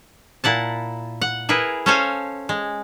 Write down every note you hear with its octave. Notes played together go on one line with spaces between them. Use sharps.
A#2 E4 F#5 A5
F#5
E4 G#4 A#4 B4
C#4 A4 C5 C#5 F5 G#5
G#3